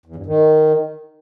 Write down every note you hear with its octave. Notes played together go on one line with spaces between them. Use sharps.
E2
G2
D#3